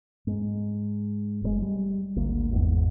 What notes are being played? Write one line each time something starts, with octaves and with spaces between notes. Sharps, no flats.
G#2
F#1 A2 G#3
G3
G#1 D2 A#3
G#1 E2 G#2